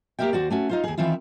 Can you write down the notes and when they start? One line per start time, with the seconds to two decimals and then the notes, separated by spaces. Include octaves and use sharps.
0.19 A#3 G4 A4 A#4 E5 G5
0.33 D#2 F#4 C5 D5
0.50 A3 C#4 F#4
0.69 D#4 F4 C5
0.84 D#2 G#4
0.98 D#3 E3 C4 E4 F4